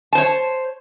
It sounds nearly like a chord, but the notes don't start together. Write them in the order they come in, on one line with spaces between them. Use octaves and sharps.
A5 C5 C#5